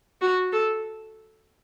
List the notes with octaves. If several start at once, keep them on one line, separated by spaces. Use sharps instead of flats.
F#4
A4